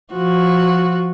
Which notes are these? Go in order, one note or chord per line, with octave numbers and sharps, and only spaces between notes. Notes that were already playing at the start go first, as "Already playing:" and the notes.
F3 F#4